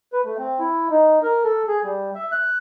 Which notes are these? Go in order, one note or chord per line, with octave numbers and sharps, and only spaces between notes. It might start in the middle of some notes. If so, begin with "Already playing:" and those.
B4
A3
C4
E4
D#4
A#4
A4
G#4
G3
E5
F#6